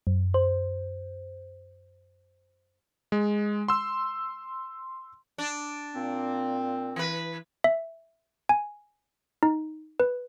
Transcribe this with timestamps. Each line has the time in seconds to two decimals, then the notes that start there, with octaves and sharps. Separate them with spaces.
0.07 F#2
0.34 C5
3.12 G#3
3.68 C6 E6
5.38 D4
5.94 A#2 C4
6.96 E3 B4
7.64 E5
8.49 G#5
9.43 D#4
10.00 B4